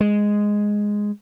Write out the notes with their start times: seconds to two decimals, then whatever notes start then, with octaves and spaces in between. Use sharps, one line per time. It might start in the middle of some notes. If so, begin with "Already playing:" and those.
0.01 G#3